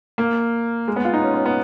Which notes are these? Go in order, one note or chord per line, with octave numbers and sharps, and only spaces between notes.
A#3
G#3
B3
F4
D#4
C#4
C#4
B3